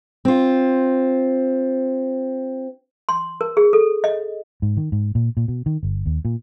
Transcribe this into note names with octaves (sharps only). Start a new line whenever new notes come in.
C4 F4
C6
A#4
G#4
A4
D#5
G#2
D#3
G#2
A#2
A#2
B2
D#3
G1
D#2
A#2